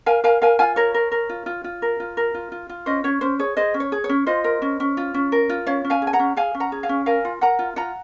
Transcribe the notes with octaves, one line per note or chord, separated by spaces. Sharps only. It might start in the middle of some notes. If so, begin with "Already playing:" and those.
A#4 F5 G#5
A#4 F5 G#5
A#4 F5 G#5
F4 F5 G#5
A#4 C#5
A#4
A#4
F4
F4
F4
A#4
F4
A#4
F4
F4
F4
C#4 C5 D#5
C#4 C#5
C#4 C5
G#4 C#5
G#4 C5 D#5
C#4
C#5
G#4
C#5
C#4
F4 C5 D#5
A#4
C#4
C#4
F4
C#4
A#4
F4
C#4 C#5 F5
C#4
F5 G#5
G#4
G#5
F#5 A#5
C#4
G#4 F5 G#5
C#4
F#5 A#5
G#4
F5 G#5
C#4
A#4 F5 G#5
F4
A#4 F#5 A#5
F4
F4 F#5 A#5